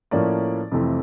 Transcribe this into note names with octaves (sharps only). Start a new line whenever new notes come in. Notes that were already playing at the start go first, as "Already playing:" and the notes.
A2 F3 A#3 C#4 D5
F2 C3 E3 A3 C4